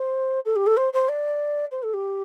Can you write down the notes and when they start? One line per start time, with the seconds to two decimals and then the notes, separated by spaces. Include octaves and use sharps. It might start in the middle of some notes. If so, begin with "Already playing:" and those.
Already playing: C5
0.45 A4
0.55 G4
0.66 A4
0.77 C5
0.93 C5
1.08 D5
1.71 C5
1.83 A4
1.93 G4